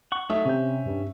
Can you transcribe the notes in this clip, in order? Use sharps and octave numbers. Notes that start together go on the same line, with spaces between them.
F#5 C#6
F#3 A3 D#4 E5
C3 C#4 G6
G2